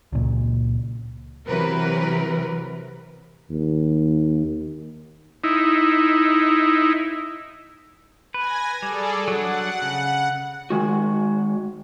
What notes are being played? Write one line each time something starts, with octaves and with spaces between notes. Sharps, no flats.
C#2 A#2
C3 E3 F#3 A#4 B4
D#2
D#4 E4
B4 G#5 G#6 A#6
G3 G#4 A4 D5
F#3 D4 F#5
C#3
D#3 G#3 F#4